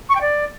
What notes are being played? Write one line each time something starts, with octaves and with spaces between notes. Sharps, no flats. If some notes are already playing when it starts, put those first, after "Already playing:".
C#6
G5
D5